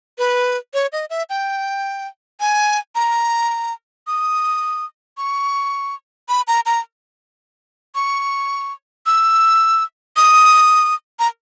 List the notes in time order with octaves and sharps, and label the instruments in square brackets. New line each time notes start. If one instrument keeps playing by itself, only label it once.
[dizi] B4
C#5
D#5
E5
G5
G#5
A#5
D#6
C#6
B5
A#5
A#5
C#6
E6
D#6
A#5